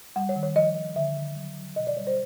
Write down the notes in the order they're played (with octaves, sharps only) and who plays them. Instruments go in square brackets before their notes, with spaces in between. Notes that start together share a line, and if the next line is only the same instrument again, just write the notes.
[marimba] G3 F#5
C#5
D#3
C#5
F3 D#5
F3
D3 E5
D3
F#3
F#3
B2 D#5
D5
G3 C#5
C5